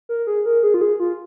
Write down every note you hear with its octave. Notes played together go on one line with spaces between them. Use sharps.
A#4
G#4
A#4
G#4
F4
G#4
F4